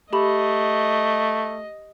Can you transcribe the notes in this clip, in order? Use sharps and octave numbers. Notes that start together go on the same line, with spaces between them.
A3 G4 D#5 B5